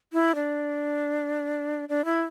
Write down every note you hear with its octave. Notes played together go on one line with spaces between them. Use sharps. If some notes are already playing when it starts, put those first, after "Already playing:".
E4
D4
D4
E4